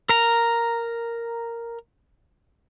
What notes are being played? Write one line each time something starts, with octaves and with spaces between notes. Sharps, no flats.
A#4 A#5